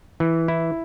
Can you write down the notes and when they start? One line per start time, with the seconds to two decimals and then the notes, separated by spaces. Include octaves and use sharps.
0.20 E3
0.48 E4